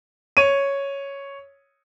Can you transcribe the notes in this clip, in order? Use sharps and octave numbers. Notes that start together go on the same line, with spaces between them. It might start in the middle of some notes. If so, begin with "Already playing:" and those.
C#5 D#7